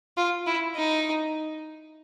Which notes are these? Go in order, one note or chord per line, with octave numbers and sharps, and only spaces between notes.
F4
E4
D#4